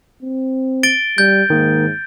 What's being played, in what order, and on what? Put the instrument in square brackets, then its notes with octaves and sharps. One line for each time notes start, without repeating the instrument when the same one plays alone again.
[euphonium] C4
[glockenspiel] A6 D7 G7
[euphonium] G3 [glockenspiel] G6
[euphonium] G#2 [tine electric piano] D#3 A#3